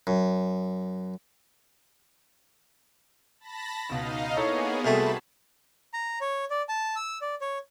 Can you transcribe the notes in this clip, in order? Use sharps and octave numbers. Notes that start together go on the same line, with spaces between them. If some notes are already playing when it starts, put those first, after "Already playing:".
F#2
A5 B5 A#6
C#2 B2 D#4 D#5 F5
A#3 B3 D#4 E4 G#4 A4 C#5
C2 A3 C4 F#4 G#4 A5 B5
A#5
C#5
D5
A5
E6
D5
C#5